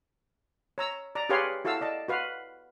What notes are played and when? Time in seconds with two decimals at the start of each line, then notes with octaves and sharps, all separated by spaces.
0.78 C#5 A#5 E6
1.15 D5 A#5
1.29 G4 G#4 B4 C#5 F5 C6
1.65 E4 F#4 A4 F5 A5 E6
1.81 D5 D#5 A5
2.08 F#4 B4 F5